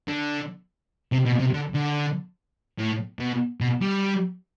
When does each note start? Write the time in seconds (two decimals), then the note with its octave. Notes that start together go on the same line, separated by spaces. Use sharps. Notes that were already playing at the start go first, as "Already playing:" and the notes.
0.08 D3
1.12 C3
1.26 B2
1.40 C3
1.53 D3
1.74 D3
2.78 A2
3.19 B2
3.61 B2
3.81 G3